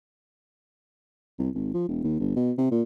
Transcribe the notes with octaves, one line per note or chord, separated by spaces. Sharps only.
C2
G#1
F3
E1
D#2
G1
B2
C3
A#2